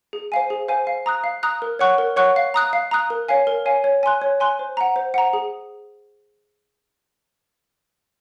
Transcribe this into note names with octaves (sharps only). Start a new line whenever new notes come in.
G#4
C5 F5 G#5
G#4
C5 F5 G#5
F5
A#5 D#6 F#6
F5
A#5 D#6 F#6
A#4
C#5 F#5 C#6 F#6
A#4
C#5 F#5 C#6 F#6
F5
A#5 D#6 F#6
F5
A#5 D#6 F#6
A#4
C#5 F5 G#5
A#4
C#5 F5 G#5
C#5
G#5 C6 F#6
C#5
G#5 C6 F#6
C5
F#5 A#5
C5
F#5 A#5
G#4